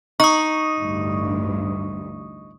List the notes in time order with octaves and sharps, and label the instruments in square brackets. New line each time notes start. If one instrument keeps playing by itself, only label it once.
[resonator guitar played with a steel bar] D#4 [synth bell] C#6 D#6
[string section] A1 D2 G2